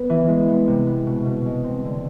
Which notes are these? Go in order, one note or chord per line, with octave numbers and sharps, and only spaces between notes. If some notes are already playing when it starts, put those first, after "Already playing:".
Already playing: B3 B4
E3
G#3
B3
C3
B3
B2
B2
G#3
C4
D3